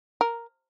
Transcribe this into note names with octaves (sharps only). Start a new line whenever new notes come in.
A#4